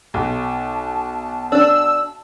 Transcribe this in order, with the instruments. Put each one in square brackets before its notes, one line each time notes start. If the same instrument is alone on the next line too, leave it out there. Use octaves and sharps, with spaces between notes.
[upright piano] B1 [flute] A5
[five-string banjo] D4 D5 [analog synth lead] E6